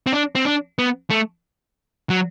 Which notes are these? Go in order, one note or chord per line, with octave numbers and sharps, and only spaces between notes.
C4
D4
C4
D4
B3
A3
F#3